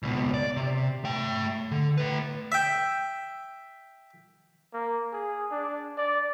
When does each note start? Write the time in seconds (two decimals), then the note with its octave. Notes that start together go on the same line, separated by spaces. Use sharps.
0.03 C#2 B2
0.34 D5
0.56 C3
1.05 A3 G5
1.71 D3
1.98 A3 B4
2.52 E5 G5
4.73 A#3
5.13 G#4
5.51 D4
5.98 D5